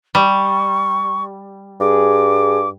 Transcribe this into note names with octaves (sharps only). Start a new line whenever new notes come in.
G3 C#6
G2 G#4 D6